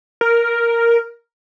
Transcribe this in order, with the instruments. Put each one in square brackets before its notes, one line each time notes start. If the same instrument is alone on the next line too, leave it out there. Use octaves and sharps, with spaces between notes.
[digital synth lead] A#4